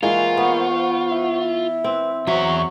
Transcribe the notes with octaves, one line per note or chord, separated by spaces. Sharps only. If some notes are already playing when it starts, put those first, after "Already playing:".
E3 G#3 A#3 F4 C5 F#5 C#6
B3
E4
C4 B4
E2 F#3 C5 E5 A#5 C#6